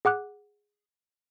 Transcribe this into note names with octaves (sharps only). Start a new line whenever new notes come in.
G#4 F#5 D6 F#6